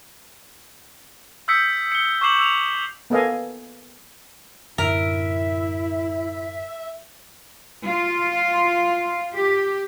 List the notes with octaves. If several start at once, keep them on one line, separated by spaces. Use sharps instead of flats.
D#6 E6 G6 B6 C#7
C#7 G7
C#6 D6 G6 C7 E7 F#7
E6 F7
A#3 B3 A4 D#5 F5 G#5
F#2 A2 D3 E4 A#4 E5
F4
G4